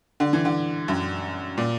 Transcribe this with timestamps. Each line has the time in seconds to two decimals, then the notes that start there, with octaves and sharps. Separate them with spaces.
0.20 D3
0.33 E3
0.45 D3
0.88 F#2
1.57 A#2